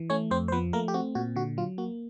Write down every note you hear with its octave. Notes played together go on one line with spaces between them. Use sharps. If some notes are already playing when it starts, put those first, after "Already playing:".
Already playing: E3
A3 C#4 C#5
F2 C4 C5
C5
F3 B3 B4
A3 A#3 A#4
G4
C4 F#4
A#2 F#4
D3 F#4
F#3 F4
A#3 F#4